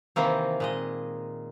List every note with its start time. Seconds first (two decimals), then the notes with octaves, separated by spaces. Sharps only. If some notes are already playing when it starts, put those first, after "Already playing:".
0.16 C3 D#3 E3 A#3 C4
0.60 A#2 G#3 D#5